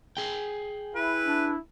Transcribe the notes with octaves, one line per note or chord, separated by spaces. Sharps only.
G#4 G5
E4 B4
D4